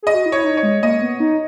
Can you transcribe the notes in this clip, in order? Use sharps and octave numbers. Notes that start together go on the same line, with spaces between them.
G#4 D#5
F#4
E4
C#5
D#4
C#5
G#3
A#3 D#5
B3
D#4